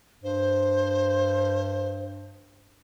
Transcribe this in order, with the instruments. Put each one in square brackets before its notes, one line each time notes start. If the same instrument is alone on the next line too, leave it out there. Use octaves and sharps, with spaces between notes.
[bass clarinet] G2 [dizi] C5